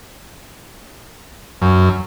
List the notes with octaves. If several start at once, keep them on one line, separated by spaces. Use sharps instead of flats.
F#2